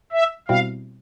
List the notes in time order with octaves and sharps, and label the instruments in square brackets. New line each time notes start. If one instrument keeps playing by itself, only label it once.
[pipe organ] E5
[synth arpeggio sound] B2 G3 C4 E4 [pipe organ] F5